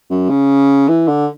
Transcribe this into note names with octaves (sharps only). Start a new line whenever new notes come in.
F#2
C#3
E3
D3